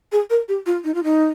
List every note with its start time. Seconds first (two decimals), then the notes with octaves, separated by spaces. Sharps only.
0.12 G#4
0.30 A#4
0.48 G4
0.66 F4
0.84 D#4
0.94 F4
1.03 D#4